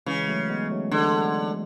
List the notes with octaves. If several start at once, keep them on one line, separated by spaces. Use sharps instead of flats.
C#3 E3 G#3
F#3 A3
G#3 B3
F#3 A3
D3 E3 G#3